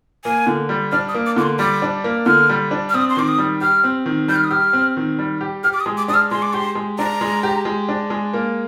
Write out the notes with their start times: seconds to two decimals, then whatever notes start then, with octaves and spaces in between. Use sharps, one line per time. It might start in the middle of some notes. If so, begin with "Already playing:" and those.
0.25 A#3 G#5
0.47 D3
0.69 G3
0.91 D4 F6
1.08 D#6
1.15 A#3
1.26 D6
1.36 D3 D6
1.42 C6
1.59 G3 D6
1.82 D4
2.04 A#3
2.26 D3 F6
2.49 G3
2.71 D4
2.89 F6
2.94 C4 D#6
3.10 C6
3.17 D#3 D6
3.28 D#6
3.38 G3
3.61 G4 F6
3.84 C4
4.06 D#3
4.28 G3 G6
4.36 F6
4.44 D#6
4.51 G4 F6
4.73 C4
4.97 D#3
5.19 G3
5.41 G4
5.64 G4 F6
5.73 D6
5.80 D#6
5.86 G#3
5.97 D6
6.08 D4 D#6
6.14 F6
6.31 G#3 C6
6.42 D6
6.53 G4 C6
6.75 G#3
6.99 D4 A#5
7.21 G#3
7.43 G4
7.65 G#3
7.89 D4
8.10 G#3
8.33 A#3